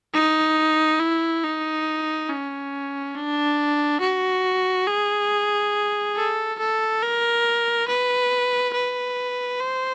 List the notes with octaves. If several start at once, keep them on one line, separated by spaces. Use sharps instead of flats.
D#4
E4
D#4
C#4
D4
F#4
G#4
A4
A4
A#4
B4
B4
C5